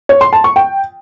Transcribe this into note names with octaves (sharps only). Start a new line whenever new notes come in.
C#5
C6
A5
C#6
G5